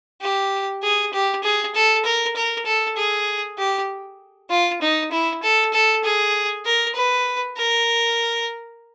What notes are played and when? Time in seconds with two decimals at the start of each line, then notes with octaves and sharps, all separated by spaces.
0.21 G4
0.83 G#4
1.13 G4
1.43 G#4
1.75 A4
2.05 A#4
2.36 A#4
2.66 A4
2.96 G#4
3.58 G4
4.50 F4
4.81 D#4
5.11 E4
5.43 A4
5.73 A4
6.04 G#4
6.65 A#4
6.95 B4
7.57 A#4